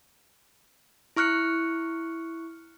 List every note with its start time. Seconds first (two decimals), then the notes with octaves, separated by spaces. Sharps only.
1.16 E4 C#6 F6 F#6 C#7